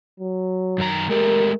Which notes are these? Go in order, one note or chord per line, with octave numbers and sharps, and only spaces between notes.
F#3
F#2 D#3 A#5
G#3 A3 G4 A#4